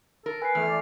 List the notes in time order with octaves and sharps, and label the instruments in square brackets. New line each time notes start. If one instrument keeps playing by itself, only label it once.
[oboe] A4 [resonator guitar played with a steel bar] A#4
[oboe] B4 [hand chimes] G#5 C7
[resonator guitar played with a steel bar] E2 [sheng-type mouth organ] A3 F6
[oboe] D5